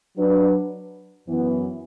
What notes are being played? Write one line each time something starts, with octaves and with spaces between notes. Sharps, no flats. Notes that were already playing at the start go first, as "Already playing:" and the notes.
F#3 D4 B4
F#2 E3 B3